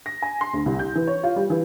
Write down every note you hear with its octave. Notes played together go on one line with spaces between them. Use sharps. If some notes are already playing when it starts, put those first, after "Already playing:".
A#6
G#5
C6
D2
C2
G6
E3
C#5
F4
G3
E3